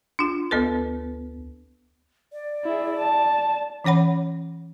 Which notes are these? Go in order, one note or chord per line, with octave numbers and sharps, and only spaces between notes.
D4 F4
D2 B3 A4 B4
D5
E4 G#4
A5
E3 C#4 C#5 F#5 B5